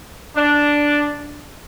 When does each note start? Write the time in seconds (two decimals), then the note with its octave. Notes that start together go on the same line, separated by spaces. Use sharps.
0.36 D4